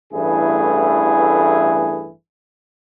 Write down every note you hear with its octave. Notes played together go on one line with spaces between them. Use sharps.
A1 G2 E3 A3 E4 G#4